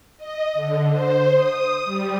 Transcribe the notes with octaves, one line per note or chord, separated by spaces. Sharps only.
D#5
D3
C5
D#6
G3